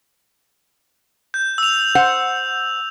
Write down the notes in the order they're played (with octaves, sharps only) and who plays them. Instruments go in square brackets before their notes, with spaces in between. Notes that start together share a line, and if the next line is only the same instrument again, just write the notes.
[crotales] G6
E6 F7
[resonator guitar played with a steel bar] C5 F#5